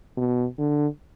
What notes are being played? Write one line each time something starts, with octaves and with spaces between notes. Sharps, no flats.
B2
D3